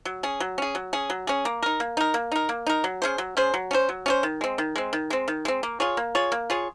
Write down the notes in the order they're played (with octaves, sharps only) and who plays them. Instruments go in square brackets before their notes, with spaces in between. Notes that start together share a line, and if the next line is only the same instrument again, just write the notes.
[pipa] F#3
C#4 G#4
F#3
C#4 G#4
F#3
C#4 G#4
F#3
C#4 G#4
A#3
D#4 A#4
A#3
D#4 A#4
A#3
D#4 A#4
A#3
D#4 A#4
F#3
C#4 G#4 C5
F#3
C#4 G#4 C5
F#3
C#4 G#4 C5
F#3
C#4 G#4 C5
D#3
G#3 C4
D#3
G#3 C4
D#3
G#3 C4
D#3
G#3 C4
A#3
F4 G#4 C#5
A#3
F4 G#4 C#5
A#3
F4 G#4 C#5